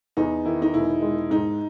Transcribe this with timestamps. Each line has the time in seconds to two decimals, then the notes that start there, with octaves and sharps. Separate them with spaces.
0.17 E2 D#4
0.45 D#3 E4
0.62 D#4
0.74 E1 E4
1.02 G#3
1.30 G#2 D#4